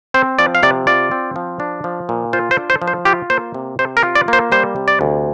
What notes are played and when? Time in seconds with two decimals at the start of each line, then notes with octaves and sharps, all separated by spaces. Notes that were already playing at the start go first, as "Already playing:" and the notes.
0.14 C4 C5
0.39 F3 D5
0.55 F5
0.63 C3 D5
0.87 F4 D5
1.11 C4
1.36 F3
1.60 D4
1.84 F3
2.09 A#2
2.33 F4 C5
2.51 C5
2.58 D4
2.70 C5
2.82 F3
2.88 C5
3.05 F4 G4
3.30 A#3 C5
3.54 C3
3.79 C3 C5
3.97 A#4
4.03 F4
4.15 D5
4.28 A#3
4.33 C5
4.52 G3 C5
4.76 C3
4.88 D5
5.01 D2